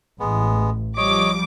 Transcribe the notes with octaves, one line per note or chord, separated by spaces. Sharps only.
A1 G#3 B3
F3 G3 C#5 D#5 D6